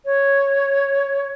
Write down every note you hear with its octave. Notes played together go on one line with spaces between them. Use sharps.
C#5